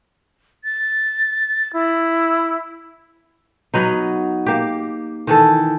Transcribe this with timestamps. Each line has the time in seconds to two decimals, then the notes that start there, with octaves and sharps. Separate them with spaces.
0.64 A6
1.73 E4
3.74 F#3 B3 D#4
4.46 A#3 G4
5.27 D#3 E3 A4